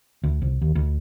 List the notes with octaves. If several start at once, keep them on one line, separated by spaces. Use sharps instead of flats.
D2
C2
D#2
D2